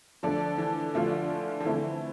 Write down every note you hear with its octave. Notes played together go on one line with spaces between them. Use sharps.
D3 F3 A3 D4 A4 D5
E3
D3 F3 A3 D4 F4
F3
D3 E3 A3 C4 E4